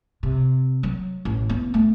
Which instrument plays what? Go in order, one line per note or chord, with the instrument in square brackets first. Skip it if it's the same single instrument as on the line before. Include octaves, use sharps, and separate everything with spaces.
[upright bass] C3
F#3
A1
B3
A3